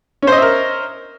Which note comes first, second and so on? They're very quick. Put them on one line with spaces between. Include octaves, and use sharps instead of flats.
C#4 C5 D#5 E5 A#4